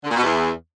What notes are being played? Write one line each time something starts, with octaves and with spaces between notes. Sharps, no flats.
D3
A#2
B2
E2